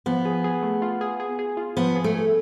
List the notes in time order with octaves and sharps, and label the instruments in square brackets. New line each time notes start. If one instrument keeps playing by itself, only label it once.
[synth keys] F3 [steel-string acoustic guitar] B3
[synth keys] G#4
G#4
A3
F4
G#4
G#4
G#4
F4
[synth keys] F3 [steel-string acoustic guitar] B3
[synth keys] G#4
[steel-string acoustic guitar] A3
[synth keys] G#4